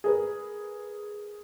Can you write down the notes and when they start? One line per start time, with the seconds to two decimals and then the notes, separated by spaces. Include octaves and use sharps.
0.04 G#4 A#4 B4